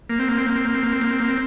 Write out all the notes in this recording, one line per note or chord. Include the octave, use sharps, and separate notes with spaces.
A#3
C4
A#3
C4
A#3
C4
A#3
C4
A#3
C4
A#3
C4
A#3
C4